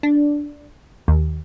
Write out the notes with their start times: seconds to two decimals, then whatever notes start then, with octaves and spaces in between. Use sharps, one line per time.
0.03 D4
1.08 D#2